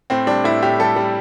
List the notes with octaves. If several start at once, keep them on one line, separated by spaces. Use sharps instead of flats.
A2 C4
G3 D4
A2 E4
A2 G4
G3 A4
G3